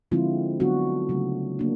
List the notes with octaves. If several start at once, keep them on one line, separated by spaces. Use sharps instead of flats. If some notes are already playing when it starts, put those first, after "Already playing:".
D3 F3 G#3 C4 E4 F4
D3 F#3 B3 D4 F#4
C#3 F#3 A3
A#3 D4